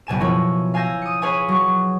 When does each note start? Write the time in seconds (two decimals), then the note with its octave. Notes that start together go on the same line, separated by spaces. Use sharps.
0.07 F#1 B2 G#5 E7
0.20 B2 F3 E4 A#4 C#5 G#5
0.74 F5 G#5 E6 G6 A#6
1.02 D#6 C#7
1.22 G#4 B4 C#5 F5 G#5 D#6
1.48 F#3 C#6